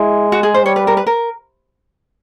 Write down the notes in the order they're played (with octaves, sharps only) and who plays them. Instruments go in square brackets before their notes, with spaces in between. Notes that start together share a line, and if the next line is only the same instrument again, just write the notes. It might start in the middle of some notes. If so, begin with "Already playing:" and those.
Already playing: [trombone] G#3 [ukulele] E4
[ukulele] F#4
G#4
C5
[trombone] G3 [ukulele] C#5
[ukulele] B4
A#4
B4
A#4